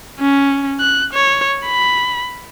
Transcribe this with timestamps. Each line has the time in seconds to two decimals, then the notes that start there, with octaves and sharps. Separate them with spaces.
0.20 C#4
0.80 F#6
1.14 C#5
1.66 B5